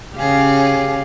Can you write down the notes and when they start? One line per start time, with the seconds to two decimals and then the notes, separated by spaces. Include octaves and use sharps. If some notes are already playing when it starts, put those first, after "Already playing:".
0.17 C#3 C#4 G4 G#4 F5